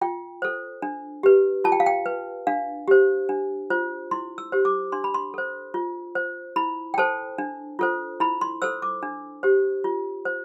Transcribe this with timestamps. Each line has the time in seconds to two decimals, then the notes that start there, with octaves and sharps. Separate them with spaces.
0.01 F4 G5
0.42 A4 C5
0.82 D4
1.23 G4 B4
1.64 F4 A5
1.72 G5
1.80 F5
1.86 G5
2.06 B4
2.47 D4 F5
2.88 G4 C5
3.29 D4
3.70 F4 C5
4.11 E4 C6
4.38 E6
4.52 G4 C5
4.65 D6
4.92 D4 C6
5.04 B5
5.14 C6
5.34 A4 C5
5.74 F4
6.15 C5
6.56 E4 B5
6.94 G5
6.98 A4 C5 A5
7.38 D4
7.79 F4 A4 C5
8.20 E4 B5
8.41 C6
8.62 A4 C5 E6
8.82 D6
9.03 D4
9.43 G4 C5
9.84 F4
10.25 C5